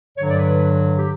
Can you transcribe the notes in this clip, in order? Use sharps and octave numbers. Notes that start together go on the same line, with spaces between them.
G2 D3 F#3 C#5
D5
B4
G4